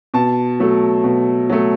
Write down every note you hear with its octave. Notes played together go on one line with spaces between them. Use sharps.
B2 A5
F#3 A3
B2
F#3 A3